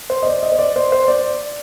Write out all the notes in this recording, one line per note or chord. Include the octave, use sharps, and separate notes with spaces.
C5
D#5
D5
D#5
C5
D5
C5
C5
D5